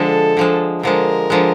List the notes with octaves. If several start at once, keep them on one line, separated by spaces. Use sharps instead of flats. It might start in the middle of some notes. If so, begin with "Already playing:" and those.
Already playing: D3 F3 G#3 A4
D3 F3 G#3
D3 F3 G#3 A#4
D3 F3 G#3